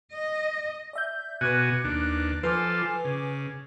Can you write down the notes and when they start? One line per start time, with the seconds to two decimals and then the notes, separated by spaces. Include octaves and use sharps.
0.13 D#5
0.93 D5 E5 G6
1.41 B2 F#4 B4 G#5 D6 F#6
1.84 D#2 D4
2.43 F3 F4 A4 B4 G#5 D6
3.05 C#3